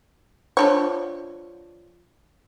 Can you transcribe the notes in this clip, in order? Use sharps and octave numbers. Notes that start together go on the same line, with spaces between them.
F3 D4 C#5